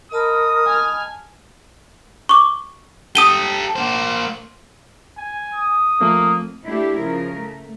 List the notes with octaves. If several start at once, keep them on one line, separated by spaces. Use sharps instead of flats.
A#4 D#5 A5 B5 D#6
G#5 F6
C#6 D6
G4 A4 D#6 D#7 G7
A#3 C5
G#5
D#6
F3 A3 A#3 C4
A3 D4 E4 G4
C#3 F3 A#4
A3